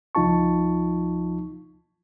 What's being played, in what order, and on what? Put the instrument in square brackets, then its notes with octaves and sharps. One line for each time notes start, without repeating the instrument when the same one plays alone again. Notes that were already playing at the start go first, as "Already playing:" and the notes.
[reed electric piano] C#2 F3 D#4 F4 A5 C#6